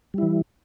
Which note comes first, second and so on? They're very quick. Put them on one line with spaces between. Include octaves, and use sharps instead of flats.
G3 E4 E3